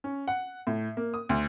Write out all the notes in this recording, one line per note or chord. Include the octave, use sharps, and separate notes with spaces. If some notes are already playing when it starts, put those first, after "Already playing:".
C#4
F#5
A2
A#3
D#6
D2